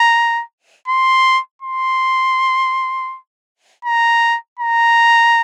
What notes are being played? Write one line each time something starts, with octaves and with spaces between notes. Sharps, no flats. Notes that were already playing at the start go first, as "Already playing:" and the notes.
Already playing: A#5
C6
C6
A#5
A#5